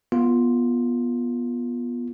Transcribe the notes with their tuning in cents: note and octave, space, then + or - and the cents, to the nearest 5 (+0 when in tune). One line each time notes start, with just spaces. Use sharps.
B3 -20 F4 +0